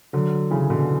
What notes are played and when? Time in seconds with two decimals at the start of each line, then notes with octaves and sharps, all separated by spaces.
0.13 D3 F#3
0.51 C#3 E3
0.70 B2 D3